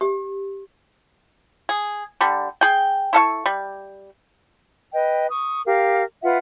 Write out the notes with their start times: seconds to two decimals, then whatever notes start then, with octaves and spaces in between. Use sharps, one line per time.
0.01 G4
1.69 G#4
2.21 D3 G3
2.61 G#4 G5
3.13 E4 A4 F5 C#6
3.46 G3
4.93 B4 D#5 G5
5.31 C#6 D#6
5.65 G4 A#4 F5
6.23 F4 B4 E5 F#5